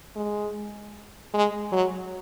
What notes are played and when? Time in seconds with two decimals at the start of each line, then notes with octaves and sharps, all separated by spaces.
0.16 G#3
1.34 G#3
1.72 F#3